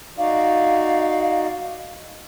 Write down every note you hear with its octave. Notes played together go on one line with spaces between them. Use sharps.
D#4 F#4 D5 F5